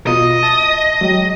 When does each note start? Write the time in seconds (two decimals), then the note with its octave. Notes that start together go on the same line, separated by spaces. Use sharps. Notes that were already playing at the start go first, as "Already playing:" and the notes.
0.07 B2 F4 D#5
0.43 E5 A5
1.01 F#3 G#3 G4